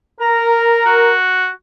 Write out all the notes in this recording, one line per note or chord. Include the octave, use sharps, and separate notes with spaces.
A#4 A#5
F#4